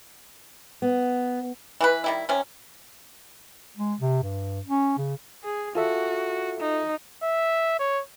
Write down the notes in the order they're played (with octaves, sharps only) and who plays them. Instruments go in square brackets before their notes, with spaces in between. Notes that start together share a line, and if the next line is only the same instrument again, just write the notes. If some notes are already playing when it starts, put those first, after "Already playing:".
[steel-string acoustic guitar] B3
[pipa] E3 A4 B4
D#3 G3 E4
C3 C#4
[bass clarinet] G#3
C3
G2
C#4
C#3
[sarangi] G#4
[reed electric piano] F4 A4 E5 [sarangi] F#4
[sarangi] D#4
[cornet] E5
C#5